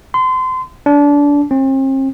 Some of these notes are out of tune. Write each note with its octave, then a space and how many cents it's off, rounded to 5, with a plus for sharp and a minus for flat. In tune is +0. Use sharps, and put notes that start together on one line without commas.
C6 -30
D4 -25
C4 +40